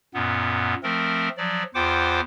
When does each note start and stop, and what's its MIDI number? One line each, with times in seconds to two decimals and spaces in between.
0.14 0.74 42
0.14 0.74 46
0.14 0.74 59
0.83 1.29 53
0.83 1.29 57
0.83 1.29 60
0.83 1.29 70
1.37 1.63 53
1.37 1.63 54
1.37 1.63 74
1.75 2.21 40
1.75 2.21 65
1.75 2.21 72
1.75 2.21 78
1.75 2.21 79
1.75 2.21 86